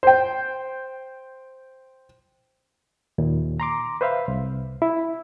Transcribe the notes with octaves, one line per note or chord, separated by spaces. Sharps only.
C5 G5
D#2 A#2
A#5 C6 D6
B4 C5 E5 F5 B5
C2
E4